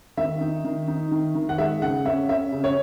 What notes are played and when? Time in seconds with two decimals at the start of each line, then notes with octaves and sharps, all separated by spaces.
0.17 D#3 E5
0.41 D#4
0.65 D#3
0.88 D#4
1.11 D#3
1.35 D#3
1.49 F#5
1.58 G#3 E5
1.82 C#3 F#5
2.05 C#4 E5
2.29 C#4 E5
2.52 C#3
2.64 C#5